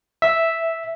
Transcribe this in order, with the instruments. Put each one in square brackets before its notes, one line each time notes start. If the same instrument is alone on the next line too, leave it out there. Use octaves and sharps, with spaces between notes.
[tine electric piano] E5